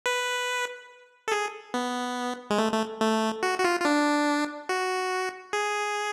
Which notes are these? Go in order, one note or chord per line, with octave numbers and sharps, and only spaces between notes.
B4
A4
G#4
B3
G#3
A3
A3
A3
F#4
F#4
F4
F4
D4
F#4
G#4